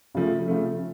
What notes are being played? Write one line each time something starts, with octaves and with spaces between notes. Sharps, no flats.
C#3 F3 A3
C#3 F3 A3